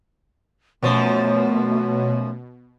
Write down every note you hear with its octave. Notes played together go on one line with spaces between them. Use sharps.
F#2 B2 F3 A3